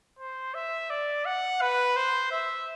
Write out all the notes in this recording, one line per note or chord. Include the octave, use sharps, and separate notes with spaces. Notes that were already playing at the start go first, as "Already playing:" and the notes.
C5
E5
D5
F#5
B4
C5
E5